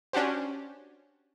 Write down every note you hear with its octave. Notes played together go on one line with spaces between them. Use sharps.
C#4 D4 F#4 G4 C5